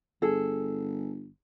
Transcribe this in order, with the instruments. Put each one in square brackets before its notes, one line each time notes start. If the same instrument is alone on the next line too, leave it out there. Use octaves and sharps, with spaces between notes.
[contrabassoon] G1 [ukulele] G#4 A4